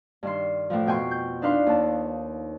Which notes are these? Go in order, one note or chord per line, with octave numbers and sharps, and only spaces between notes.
G2 D#3 C6
A2 E3 F3
F2 B2 G5 G#5 C6 C#6
G6
D4 D#4 B4 F5 C6
D#2 A5